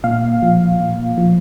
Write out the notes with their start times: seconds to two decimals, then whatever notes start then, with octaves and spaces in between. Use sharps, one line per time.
0.04 A#2 F5
0.42 F3
0.80 A#2
1.18 F3